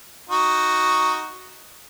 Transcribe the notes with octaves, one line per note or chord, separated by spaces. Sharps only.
D#4 F#4